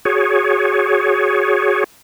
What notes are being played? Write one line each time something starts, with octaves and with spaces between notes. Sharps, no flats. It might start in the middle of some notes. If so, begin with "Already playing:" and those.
F#4 G#4 C#5